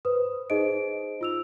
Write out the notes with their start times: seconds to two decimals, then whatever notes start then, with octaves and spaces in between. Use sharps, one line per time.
0.05 B4 C5 D#6
0.50 D#4 G#4 C5 D#5 D7
1.21 F4 E6 F7